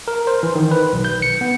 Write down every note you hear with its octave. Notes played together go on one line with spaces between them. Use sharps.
A#4
C5
E3
D#3
B4
B1
G6
C#7
B3